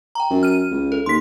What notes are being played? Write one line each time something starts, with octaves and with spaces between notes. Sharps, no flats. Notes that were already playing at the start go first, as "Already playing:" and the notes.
G5 A#5
F#2
F6 D#7
C#2
A4
D#2 C6 B6